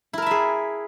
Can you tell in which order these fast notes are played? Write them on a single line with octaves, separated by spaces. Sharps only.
E4 A#4 A5 E5 G#4